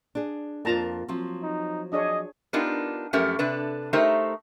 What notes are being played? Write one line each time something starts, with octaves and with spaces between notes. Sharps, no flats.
D4 G#4
F2 A#3 F4 A#4 A5 A#5
F3 F#3 C4
D#4
D4 G#4 C#5 D#5
B3 D4 D#4 F4 G4 A#4
F#2 F3 A3 C#4 G4 A#4
C3 D4 A4 B4
A3 D#4 G4 A#4 C5 E5